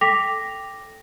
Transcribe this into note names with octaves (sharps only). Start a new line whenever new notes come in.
A4 G5 D6 A#6 B6 F7